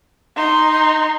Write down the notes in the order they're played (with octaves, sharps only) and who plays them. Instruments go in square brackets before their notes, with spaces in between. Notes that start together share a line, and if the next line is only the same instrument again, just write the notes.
[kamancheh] D#4 C6